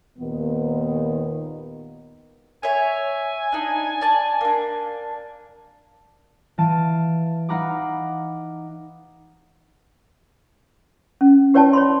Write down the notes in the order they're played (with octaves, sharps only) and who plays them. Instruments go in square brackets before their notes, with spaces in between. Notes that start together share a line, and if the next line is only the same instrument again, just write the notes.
[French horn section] D#2 A#2 D#3 B3
[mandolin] C#5 E5 [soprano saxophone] G#5
[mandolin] D4 D#4
D5 A5
A#3 D4
[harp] E3 F5 A5 D7 D#7
D#4 F5 F#5 A#5 B5 D6
[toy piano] C#4
G4 B4 C#5 D5 G5 A5
C#5 B5 C6